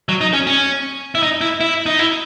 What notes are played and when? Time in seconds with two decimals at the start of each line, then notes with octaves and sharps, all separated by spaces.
0.09 F#3
0.21 D#4
0.34 C#4
0.47 C#4
1.15 E4
1.23 D#4
1.41 E4
1.61 E4
1.86 D#4
1.99 E4